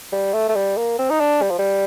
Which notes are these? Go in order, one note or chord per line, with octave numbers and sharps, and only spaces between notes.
G3
A3
A3
G3
A#3
C4
D#4
D4
G3
F3
G3